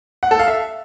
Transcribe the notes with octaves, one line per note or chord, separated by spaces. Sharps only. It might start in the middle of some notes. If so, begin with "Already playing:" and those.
F#5
A4
F5
E5